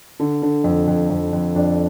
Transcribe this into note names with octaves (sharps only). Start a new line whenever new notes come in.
D3
D3
F2
F2
F2
F2
F2 D4